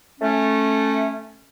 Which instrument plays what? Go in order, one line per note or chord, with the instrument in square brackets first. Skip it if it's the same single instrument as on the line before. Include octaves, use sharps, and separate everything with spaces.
[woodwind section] A3 C#4